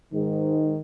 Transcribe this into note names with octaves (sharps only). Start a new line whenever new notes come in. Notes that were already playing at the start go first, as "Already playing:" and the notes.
G#2 D#3